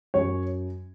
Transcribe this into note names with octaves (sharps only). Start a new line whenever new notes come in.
F#2 C#5